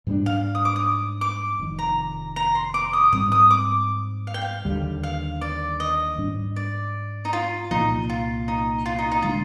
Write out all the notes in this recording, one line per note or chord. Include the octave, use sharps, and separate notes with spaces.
G#2 G3 A#3 D4
F5
D#6
D6
D#6
D6
F1 F2 D#3
A#5
A#5
C6
D6
D#6
G#2 G3 C4 D#6
D#6
D6
F5
G5
F5
D#2 D3 G3
F5
D5
D#5
G#2 G3 D4
D5
D#4
F4
C2 A#2 F3 D#4
F4
D#4
F4
D#4
D#4
D3 G#3 D4 F4